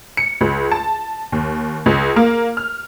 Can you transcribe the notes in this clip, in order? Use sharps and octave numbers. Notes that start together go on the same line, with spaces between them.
C#7
C#2
A5
D#2
C#2
A#3
F6